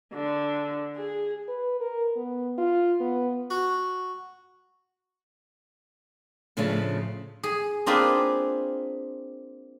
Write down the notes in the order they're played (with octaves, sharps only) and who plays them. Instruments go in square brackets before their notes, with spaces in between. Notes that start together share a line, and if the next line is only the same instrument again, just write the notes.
[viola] D3
G#4
[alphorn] B4
A#4
B3
F4
B3
[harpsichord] F#4
[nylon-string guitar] A2 C#3 F3 A3 C#4 D4
[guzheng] G#4
A#3 C4 D4 F4 G#4 B4